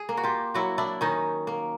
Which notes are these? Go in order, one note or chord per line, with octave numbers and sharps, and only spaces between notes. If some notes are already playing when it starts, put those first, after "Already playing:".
Already playing: G#4
A#3
F#4
F4 G4
F#3 E4 F#4
D4 E4
D#3 C#4 D#4
A#3